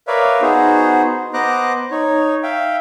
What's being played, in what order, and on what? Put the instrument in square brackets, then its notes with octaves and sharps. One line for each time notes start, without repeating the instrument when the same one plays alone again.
[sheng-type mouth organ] A#4 B4 C#5 D5 E5 F5
B3 D#4 F#4 G#4 C5
B3 C5 D#5 A#5 D6 F#6
D#4 C#5
E5 F5 G5